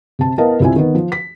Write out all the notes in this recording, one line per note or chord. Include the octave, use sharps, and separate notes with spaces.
C3 A5
B3 E4 A#4 D#5 F5 A5
C2 C4 E4 F4 G#5
D#3 B3
F3
B6